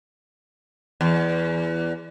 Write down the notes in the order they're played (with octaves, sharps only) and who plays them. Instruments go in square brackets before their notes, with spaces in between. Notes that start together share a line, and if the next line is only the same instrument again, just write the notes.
[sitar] E2